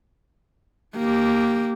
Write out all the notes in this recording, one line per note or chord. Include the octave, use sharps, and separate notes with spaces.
A#3 G4